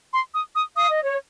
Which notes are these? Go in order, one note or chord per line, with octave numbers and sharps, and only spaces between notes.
C6
D#6
D#6
F5 D#6
D#5
C#5